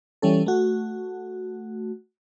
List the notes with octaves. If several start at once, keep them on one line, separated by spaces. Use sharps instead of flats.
E3 G3 C#4 A4
A3 F#4